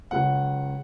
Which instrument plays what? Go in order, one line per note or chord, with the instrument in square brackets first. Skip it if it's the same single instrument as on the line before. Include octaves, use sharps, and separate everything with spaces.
[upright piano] C#2 C#3 F#3 F#5